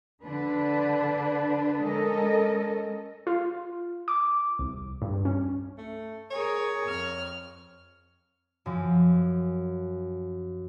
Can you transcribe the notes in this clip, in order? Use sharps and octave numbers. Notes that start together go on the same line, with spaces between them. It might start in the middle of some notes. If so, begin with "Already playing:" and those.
D3 D4 B4
G#3 C#4 A4 A#4 D#5
F4
D6
C2
G2
C#4
A3
G#4 A#4 C#5
F2 F6
F#2 F3